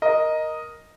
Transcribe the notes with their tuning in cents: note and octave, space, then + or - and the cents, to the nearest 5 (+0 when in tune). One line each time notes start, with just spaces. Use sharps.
A#4 +5 D#5 +0